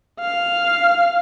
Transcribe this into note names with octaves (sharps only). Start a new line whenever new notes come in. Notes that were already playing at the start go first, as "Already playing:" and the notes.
F5